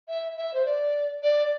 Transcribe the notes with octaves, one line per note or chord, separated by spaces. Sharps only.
E5
E5
C5
D5
D5